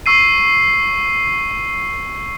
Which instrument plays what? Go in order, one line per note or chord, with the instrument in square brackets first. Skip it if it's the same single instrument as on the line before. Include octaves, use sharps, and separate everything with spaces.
[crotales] C#6 E6 C7 D#7